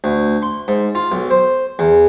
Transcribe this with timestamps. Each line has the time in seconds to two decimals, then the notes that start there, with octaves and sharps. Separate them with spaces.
0.04 D2
0.42 C6
0.68 G#2
0.95 F4
1.12 B1
1.31 C5
1.79 E2